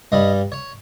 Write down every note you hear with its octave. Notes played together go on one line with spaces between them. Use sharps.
G2 G3 D#5
C#5